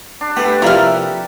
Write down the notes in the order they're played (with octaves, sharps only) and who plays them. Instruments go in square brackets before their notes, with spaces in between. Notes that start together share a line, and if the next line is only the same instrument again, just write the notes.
[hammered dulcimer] D4
[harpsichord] A3 B3 [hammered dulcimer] G4 A4 B4
[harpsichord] C3 F3 A#3 [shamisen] E4 F4 E5 [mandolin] A#5 F6